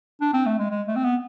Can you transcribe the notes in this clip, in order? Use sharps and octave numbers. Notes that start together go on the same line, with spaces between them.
D4
C4
A3
G#3
G#3
A3
C4
B3